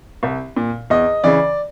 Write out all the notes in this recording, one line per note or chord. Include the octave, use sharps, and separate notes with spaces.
C2
A#2
E2 D#5
C#3 E3 D5